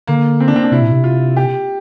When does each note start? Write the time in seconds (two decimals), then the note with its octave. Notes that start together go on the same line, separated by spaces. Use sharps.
0.07 D3 A#3
0.40 C4
0.48 D4
0.56 C4
0.64 D4
0.72 C3 E4
0.82 A#2
0.92 C3
1.04 F4
1.36 G4